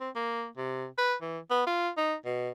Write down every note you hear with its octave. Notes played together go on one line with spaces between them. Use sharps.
C4
A#3
C3
B4
E3
B3
F4
D#4
B2